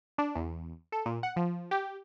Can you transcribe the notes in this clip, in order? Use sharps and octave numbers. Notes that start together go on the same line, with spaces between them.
D4
E2
A4
A#2
F#5
F3
G4